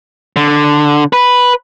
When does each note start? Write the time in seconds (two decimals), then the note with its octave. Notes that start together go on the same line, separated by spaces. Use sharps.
0.36 D3
1.13 B4